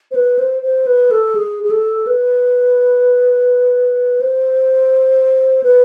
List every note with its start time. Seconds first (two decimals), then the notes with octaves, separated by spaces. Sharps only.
0.11 C5
0.15 B4
0.39 C5
0.63 C5
0.87 B4
1.11 A4
1.35 G#4
1.63 G#4
1.70 A4
2.07 B4
4.21 C5
5.63 B4